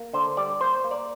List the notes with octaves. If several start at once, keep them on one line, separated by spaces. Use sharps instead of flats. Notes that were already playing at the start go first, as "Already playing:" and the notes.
Already playing: A#3
D3 C5
G3 D5
A#3 C5
A#3
D5